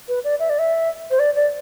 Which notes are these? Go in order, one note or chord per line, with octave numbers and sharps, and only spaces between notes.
B4
D5
E5
D5
E5
C5
D5
D5